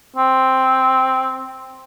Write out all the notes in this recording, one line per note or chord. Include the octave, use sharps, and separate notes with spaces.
C4